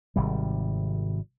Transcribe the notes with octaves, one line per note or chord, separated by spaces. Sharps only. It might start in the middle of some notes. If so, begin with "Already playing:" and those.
G#1 C3 G3